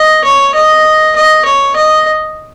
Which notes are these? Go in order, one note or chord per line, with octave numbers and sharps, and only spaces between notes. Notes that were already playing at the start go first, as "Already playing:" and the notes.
Already playing: D#5
C#5
D#5
D#5
C#5
D#5